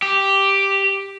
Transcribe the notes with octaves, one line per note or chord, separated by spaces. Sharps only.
G4